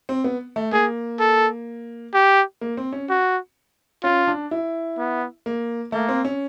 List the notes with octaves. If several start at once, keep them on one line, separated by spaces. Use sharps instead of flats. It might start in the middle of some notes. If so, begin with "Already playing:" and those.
C4
B3
A3
A#3 G#4
A4
G4
A#3
C4
C#4
F#4
C#4 F4
D4
E4
B3
A#3
A3 A#3
C4
C#4